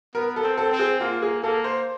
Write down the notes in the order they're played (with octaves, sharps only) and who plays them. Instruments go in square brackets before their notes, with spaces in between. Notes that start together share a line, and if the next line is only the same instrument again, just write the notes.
[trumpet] B3 [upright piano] A#4
[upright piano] A4
[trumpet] C4
[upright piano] A4
[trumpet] C4
[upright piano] G#4
[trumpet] A#3 [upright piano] F4
[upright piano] G#4
[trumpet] A#3 [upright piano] A4
[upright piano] C5